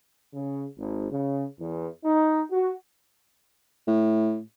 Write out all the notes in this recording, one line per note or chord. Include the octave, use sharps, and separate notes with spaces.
C#3
G#1
C#3
E2
D#4
F#4
A2